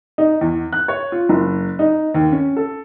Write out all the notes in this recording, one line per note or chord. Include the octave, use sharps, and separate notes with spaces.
D#4
E2
F#6
C#5
F4
F#1
D#4
D#2
C#4
A4